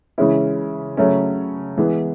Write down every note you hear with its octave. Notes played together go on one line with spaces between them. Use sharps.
C#3 E3 G#3 C#4 E4
C#3 F#3 A3 C#4
E3 G#3 B3